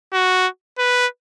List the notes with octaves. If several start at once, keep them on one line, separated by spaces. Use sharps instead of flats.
F#4
B4